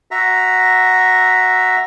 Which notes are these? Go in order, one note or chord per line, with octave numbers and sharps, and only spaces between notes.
F#4 E5 A#5